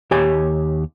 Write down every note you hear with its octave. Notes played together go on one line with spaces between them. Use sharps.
D#2 G4 C#5 G#5